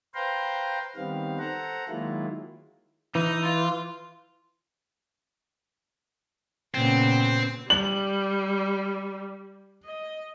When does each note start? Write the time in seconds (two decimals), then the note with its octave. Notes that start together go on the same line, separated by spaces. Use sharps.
0.15 B4 C5 F5 G5 A#5 C6
0.96 D#3 G3 B3 C4 F5
1.39 A4 C5 F#5 A#5
1.89 D#3 F#3 G#3 A#3 E4 F4
3.15 E3 D#4
3.43 F4
6.74 A#2 C#3 B3 C4
7.70 G3 F#7
9.85 D#5